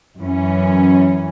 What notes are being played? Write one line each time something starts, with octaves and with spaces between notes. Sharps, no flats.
F#2 E3 C#4